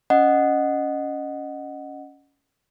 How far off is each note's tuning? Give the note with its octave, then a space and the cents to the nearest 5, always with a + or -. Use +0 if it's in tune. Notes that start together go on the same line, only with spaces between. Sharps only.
C#4 +15 D#5 -15 F#5 +0